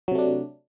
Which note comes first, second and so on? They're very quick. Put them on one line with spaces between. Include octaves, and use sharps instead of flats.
F#3 C3 A3 D4